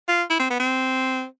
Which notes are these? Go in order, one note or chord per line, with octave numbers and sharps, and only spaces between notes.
F4
E4
C4
B3
C4